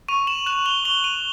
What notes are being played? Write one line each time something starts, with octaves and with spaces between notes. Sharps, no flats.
C#6 D#7 F7
E7 F#7
F#6 E7 F#7
F7 G7
C#6 F7 G7
D#7 F7